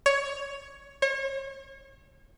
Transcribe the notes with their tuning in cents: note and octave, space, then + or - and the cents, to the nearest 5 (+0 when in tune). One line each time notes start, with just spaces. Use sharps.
C#5 +10
C#5 -35